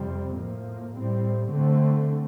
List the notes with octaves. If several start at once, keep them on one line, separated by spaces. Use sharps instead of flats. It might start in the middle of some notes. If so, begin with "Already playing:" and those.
Already playing: F2 C3 G3 C4
A2 F3 A#3
A2 G3 C4
D3 A3 C4